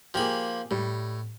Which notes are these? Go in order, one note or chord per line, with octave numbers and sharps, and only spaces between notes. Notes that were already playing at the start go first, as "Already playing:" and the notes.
F3 A#3 G4 G#4 B5
A2 G3